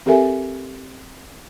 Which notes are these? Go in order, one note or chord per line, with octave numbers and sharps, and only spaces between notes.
C4 G4 A4 A#4 E5 G#5